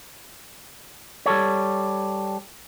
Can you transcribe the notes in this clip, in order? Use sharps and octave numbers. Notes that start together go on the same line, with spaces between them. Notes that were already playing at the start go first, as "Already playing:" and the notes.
G3 A4 C#5